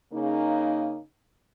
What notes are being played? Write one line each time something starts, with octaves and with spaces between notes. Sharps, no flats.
C#3 A#3 D#4